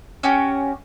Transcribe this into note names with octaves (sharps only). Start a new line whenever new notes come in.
C#4 F#4 G4